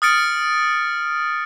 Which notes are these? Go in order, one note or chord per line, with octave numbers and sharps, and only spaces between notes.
D#6 F6 A6 C#7 D7